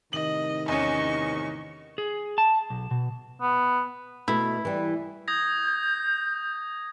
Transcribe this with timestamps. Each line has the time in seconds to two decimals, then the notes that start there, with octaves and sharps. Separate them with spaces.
0.13 A2 C3 D#3 D#5 F#7
0.68 E2 C#4 D#5 C#6
1.98 G#4
2.38 A5
2.70 B1
2.91 B2
3.41 B3
4.28 B2 A3 E4
4.65 E3 G3
5.28 D#6 G6 G#6 A#6